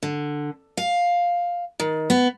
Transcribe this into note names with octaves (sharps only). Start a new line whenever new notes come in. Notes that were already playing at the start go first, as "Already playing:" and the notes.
D3
F5
D#3
B3